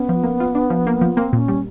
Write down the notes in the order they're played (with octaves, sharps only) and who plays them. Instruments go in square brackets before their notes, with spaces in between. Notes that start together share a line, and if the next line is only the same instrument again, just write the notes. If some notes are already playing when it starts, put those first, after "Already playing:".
Already playing: [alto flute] B3 [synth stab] C#4
[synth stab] F3
A#3
F4
D4
F3
A#3
F3
[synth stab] A#3 [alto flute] C4
[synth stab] A#2
[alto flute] C#4
[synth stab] G3